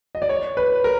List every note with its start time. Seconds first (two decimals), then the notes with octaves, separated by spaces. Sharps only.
0.15 D#5
0.22 D5
0.29 C#5
0.57 B4
0.84 A#4